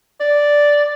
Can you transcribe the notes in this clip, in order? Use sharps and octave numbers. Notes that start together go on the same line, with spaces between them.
D5